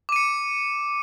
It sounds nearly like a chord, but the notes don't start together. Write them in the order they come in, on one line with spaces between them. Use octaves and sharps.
D6 D#7 C#7